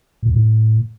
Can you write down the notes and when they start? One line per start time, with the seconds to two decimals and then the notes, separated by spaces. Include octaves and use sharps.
0.23 A2
0.28 E2
0.33 A2